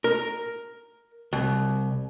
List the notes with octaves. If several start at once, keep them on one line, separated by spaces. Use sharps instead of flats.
A#4
C2